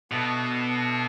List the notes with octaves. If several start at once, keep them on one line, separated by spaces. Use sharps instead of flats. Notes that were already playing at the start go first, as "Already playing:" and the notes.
B2 B3 D4 A4 E5